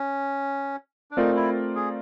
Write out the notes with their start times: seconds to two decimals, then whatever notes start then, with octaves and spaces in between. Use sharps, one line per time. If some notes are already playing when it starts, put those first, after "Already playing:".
Already playing: C#4
1.11 D4
1.17 A3 C4 D#4 F4 A#4 D5
1.36 E4
1.75 G#4